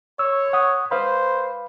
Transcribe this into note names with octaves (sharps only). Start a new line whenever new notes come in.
C#5 E6
F#5 D#6
B4 C5 F5 B5